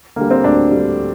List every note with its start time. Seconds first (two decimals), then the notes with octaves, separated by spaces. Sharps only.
0.16 D3 G3 A#3
0.31 C4
0.44 D2 D4
0.71 D3 G3